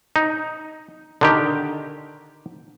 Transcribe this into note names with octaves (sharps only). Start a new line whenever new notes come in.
D#4
D3 D#3 G4